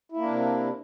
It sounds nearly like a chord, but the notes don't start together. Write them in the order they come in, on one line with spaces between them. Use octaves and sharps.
E4 A#3 D4 C3